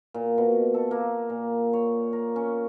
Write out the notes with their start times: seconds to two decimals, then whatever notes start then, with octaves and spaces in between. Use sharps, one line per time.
0.14 A#2
0.38 B2
0.74 A4
0.91 A#3
1.30 A#2
1.73 C#5
2.13 A#4
2.36 C#4